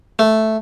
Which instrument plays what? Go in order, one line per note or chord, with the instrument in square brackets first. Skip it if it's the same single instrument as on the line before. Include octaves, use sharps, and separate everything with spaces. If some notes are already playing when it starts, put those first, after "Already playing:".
[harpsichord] A3